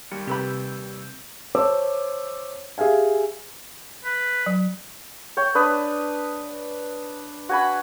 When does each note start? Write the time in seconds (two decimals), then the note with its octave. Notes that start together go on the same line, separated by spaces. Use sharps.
0.11 D#2 G3 C#7
0.27 C3 G4 B4 B5 E6 G6
1.55 C5 C#5 A5 D6 E6
2.78 G4 G#4 E5 F5 G#5
4.05 B4
4.46 F#3
5.37 C#5 G5
5.55 D4 B4 D#6
7.49 F#4 G#5 B5